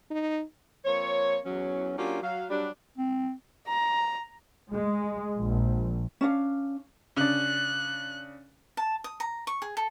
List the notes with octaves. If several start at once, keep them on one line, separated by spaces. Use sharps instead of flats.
D#4
F3 A#3 C4 C#5
E2 F#3 C#4
F#3 A#3 C#4 D4 F4 G4
F#3 F5
F#3 G3 D4
C4
A#5
G#3
A#1
C#4 D4 F5
C#3 D4 F#6
A5
D#6
A#5
C#6
G#4
A4